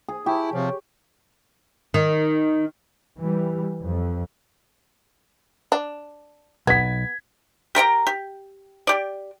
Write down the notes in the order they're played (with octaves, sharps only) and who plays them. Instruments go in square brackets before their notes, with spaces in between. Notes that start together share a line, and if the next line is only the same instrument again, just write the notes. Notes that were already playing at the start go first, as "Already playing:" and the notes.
[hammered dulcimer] G#4
[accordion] E4 [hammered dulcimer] G4 [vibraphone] G5 A5 C#6
[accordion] C3 F3 [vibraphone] C#5 C#6
[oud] D#3
[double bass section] E3 G3
F2
[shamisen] D4
[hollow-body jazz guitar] B1 [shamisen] B3 [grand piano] G#6 B6
[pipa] G4 A#4 G5 A#5
G4
G4 D5